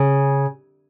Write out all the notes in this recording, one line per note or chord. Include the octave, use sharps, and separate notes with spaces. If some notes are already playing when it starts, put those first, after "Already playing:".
Already playing: C#3